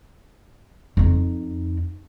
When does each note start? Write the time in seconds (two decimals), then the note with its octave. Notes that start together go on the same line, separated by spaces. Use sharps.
0.97 F2 D#4